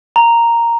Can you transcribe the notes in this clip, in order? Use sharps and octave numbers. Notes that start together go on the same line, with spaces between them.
A#5